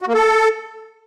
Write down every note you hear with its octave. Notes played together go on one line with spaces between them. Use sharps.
F#4
A#3
A4